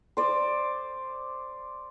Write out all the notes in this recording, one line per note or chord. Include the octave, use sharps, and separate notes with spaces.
C5 D5